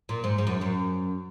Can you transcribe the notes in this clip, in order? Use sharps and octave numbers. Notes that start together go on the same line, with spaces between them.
A#2
G#2
G#2
F#2
F#2